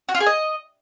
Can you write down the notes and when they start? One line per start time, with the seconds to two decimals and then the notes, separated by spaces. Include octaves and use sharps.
0.09 F#4
0.15 F4
0.20 G#4
0.26 D#5